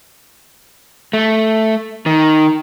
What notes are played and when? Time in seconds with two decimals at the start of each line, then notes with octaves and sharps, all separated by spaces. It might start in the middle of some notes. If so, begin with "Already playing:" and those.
1.13 A3
2.06 D#3